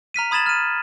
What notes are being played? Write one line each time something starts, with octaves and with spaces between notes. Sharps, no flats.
A#5 F6 B6 D#7
B5 D#6 G#6 A6 E7 F#7
F6 D#7